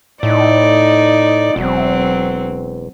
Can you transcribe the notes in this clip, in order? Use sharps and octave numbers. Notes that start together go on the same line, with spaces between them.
A2 D#4 D5
E1 F#3 C4